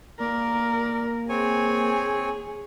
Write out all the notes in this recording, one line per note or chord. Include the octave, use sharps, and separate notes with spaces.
A#3 A#4 D5
C4 G#4 C#5 G#5